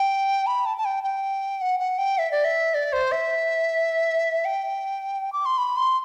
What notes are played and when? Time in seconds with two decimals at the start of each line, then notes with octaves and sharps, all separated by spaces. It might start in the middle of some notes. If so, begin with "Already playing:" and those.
Already playing: G5
0.47 B5
0.66 A5
0.78 A5
0.85 G5
1.03 G5
1.61 F#5
1.80 F#5
1.98 G5
2.18 E5
2.32 D5
2.45 E5
2.74 D5
2.93 C5
3.12 E5
4.45 G5
5.33 D6
5.46 C6
5.58 B5
5.77 C6